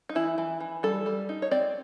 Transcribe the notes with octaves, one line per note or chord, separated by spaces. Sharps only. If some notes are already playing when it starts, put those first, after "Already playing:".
D#4
E3 E4
E3
E3
G3 A4
G3
D#4
C#5
C4 D5